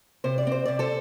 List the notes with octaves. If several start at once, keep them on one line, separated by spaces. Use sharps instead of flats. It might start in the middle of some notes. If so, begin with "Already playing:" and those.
C3 C5
D5
C4 C5
C3 D5
A4 C5